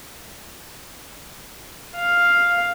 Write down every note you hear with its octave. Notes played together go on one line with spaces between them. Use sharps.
F5